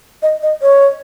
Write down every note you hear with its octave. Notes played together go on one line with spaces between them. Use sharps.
D#5
D#5
C#5